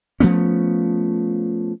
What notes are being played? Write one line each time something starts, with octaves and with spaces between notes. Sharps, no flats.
F3 A3 B3 C#4